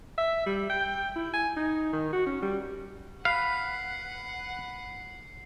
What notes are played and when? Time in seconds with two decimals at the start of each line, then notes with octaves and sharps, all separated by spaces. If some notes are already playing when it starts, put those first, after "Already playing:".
0.18 E5
0.46 G3
0.70 G5
1.16 E4
1.34 G#5
1.56 D#4
1.93 D#3
2.13 F#4
2.27 C#4
2.42 G3
3.25 B4 F5 F#5 C7